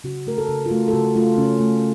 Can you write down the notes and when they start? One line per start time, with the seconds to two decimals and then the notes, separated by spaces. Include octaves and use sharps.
0.04 C#3 F#4
0.27 A3 A#4
0.38 A4
0.49 C#3
0.66 F4
0.71 A3 F#4
0.88 A4
0.93 C#3 F#4
1.16 A3 F4
1.38 C#3 C#4
1.60 A3